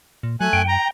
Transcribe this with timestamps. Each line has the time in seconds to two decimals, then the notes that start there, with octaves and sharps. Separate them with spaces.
0.23 A#2
0.41 F#3 A3 G#5 F#6
0.53 F#2 G5
0.68 A#5